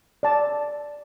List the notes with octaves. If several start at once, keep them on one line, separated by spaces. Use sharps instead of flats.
D5 A5